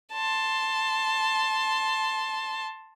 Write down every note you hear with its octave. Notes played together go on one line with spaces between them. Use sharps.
A5 C6